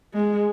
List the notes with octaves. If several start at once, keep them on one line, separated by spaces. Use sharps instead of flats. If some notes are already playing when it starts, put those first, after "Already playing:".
G#3